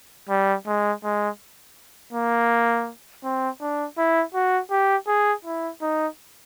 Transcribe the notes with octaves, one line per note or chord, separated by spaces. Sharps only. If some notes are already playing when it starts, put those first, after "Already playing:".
G3
G#3
G#3
A#3
C4
D4
E4
F#4
G4
G#4
E4
D#4